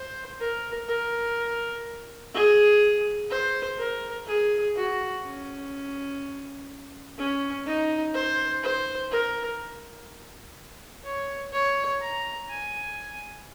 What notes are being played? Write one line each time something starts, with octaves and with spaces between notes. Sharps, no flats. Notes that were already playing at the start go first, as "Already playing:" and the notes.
Already playing: C5
A#4
A#4
G#4
C5
A#4
G#4
F#4
C#4
C#4
D#4
C5
C5
A#4
C#5
C#5
A#5
G#5